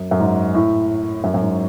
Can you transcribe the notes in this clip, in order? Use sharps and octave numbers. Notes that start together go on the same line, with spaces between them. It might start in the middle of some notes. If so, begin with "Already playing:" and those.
Already playing: F#2
F#2
G#2
A2
F#2
F#2
G#2